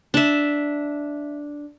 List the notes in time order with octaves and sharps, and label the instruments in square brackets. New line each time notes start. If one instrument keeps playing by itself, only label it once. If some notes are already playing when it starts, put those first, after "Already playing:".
[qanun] D4 E5